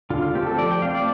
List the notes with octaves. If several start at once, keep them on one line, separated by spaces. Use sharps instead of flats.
D3 F4
F4
A3 C4 G4
A4
F3 D5
G5
A3 C4 F5
D5